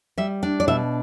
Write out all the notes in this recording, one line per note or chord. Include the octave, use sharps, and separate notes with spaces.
G3 E5
D4
D5
B2 E5